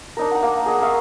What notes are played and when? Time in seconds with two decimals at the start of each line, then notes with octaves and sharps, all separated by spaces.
0.17 D4 D#4 A#4
0.31 F#5 A#5
0.42 A#3
0.66 G#4 D#5 F#5
0.81 A#4 E5 F5 C#6